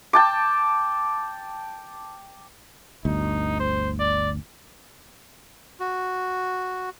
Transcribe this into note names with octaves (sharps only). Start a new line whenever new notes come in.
G5 A5 D6
G1 D2 D#4
C5
D5
F#4